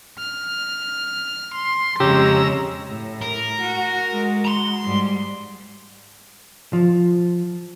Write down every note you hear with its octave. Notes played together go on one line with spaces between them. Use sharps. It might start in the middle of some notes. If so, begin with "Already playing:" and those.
F6
C6
F2 C#3 G#3 G4 A#5 E6
A2
A#4
F#4
G#3 F#4
A#5 C6
G#2 G3
F3